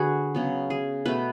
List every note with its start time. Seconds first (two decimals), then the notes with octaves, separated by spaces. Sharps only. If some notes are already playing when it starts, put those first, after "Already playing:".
Already playing: D3 F#4 G#4 B4
0.35 C#3 F#3 B3
0.70 G#4
1.06 B2 A3 B4